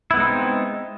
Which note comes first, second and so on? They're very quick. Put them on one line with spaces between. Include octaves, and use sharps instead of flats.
E4 B3 G#3 D#4 C4